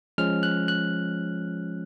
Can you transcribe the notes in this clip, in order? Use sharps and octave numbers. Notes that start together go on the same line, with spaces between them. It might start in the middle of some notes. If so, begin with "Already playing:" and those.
F3 G#3 C#4 F6
F#6
F#6